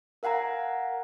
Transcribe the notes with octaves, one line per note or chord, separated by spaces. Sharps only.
A#4 F5 F#5 G#5 A#5